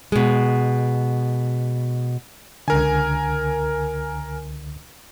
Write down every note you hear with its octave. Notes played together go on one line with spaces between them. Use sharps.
B2 G#3
C#2 D3 A#4 G#5